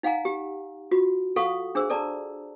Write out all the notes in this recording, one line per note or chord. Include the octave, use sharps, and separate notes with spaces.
D#4 F5 F#5 G#5 A#5
G4
F4 F#4
A4 F5 F#5 C#6 D#6
D4 G#4 C5 E6
A4 D5 A5 A#5